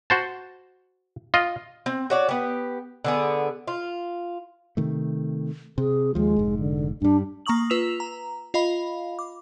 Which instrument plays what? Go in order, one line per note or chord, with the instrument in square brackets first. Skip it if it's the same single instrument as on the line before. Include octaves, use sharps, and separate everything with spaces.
[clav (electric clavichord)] F#4 C5 A5
F4 D#5
[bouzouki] C4
F#4 C#5 D5
B3 G4
D3 B3 G#4
F4
[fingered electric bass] C3 D#3 A3
[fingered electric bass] C3 [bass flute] G#4
[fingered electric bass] D#2 F3 [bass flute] G#3
[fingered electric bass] F1 G#2
[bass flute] D3
[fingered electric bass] G2 G3 [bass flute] D4
[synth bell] A#3 A#5 C#6 D#6 F#7
F4 B4 E6 B6 E7 F7
A#5
F4 D#5 F5 B5
D6